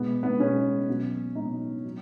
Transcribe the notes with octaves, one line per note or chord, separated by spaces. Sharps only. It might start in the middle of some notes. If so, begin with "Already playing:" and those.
Already playing: B2 G#3 B3
B3
B2 G#3 C#4
B2 F#3
B2 F#3 D#4
F#3